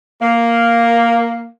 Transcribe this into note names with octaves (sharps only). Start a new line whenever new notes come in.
A#3